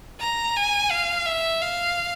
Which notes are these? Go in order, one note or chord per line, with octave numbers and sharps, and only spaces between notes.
A#5
G#5
F5
E5
F5